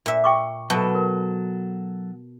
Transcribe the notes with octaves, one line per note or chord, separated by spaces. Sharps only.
A#2 E5
G5 C#6 D6
B2 F#3 A4 A5
A#4